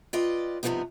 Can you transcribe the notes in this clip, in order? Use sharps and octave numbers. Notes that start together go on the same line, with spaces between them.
F4 B4 D5 D#5 G5
G2 C3 E3 F3 B3 D#4